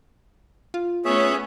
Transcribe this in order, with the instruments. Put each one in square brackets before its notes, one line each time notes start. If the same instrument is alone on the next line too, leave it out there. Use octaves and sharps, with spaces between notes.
[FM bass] F4
[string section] A3 B3 C#4 [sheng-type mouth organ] G#4 C#5 E5